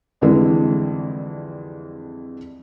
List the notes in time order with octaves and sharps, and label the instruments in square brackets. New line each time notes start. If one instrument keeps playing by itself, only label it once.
[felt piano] C2 F2 D3 E3 G#3